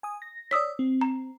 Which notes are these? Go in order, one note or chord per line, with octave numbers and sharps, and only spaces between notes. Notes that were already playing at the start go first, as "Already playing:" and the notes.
G#5 D#6
A#6
C#5 D5 D#6 E6 B6
C4
A#5